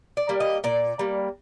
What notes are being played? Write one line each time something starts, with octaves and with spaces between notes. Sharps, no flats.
D5
G3 A#3
D#5
A#2 D5
G3 A#3